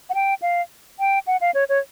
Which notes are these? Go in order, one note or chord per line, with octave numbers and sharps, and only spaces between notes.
F#5
G5
F5
G5
F#5
F5
C#5
C#5